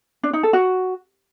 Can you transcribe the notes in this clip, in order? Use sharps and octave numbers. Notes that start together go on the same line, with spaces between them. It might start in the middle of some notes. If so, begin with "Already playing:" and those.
D4
D#4
A4
F#4